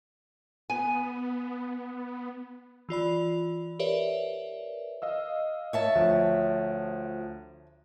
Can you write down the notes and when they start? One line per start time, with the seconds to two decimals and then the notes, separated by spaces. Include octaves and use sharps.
0.70 B3 G#5
2.89 E3 F4 D5 B5
3.79 G4 A#4 B4 C#5 D5 E5
5.02 D#5 F5 E6
5.73 C#5 E5 A5
5.95 D2 F3